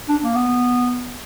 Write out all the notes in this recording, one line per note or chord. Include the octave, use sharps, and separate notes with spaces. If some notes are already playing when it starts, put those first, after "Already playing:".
D4
A#3
B3